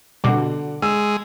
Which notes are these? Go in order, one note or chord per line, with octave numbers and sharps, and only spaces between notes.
B2 D3 G3 F#5 D6
G#3 E6